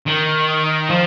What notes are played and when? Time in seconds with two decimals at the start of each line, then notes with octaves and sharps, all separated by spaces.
0.06 D#3
0.90 F3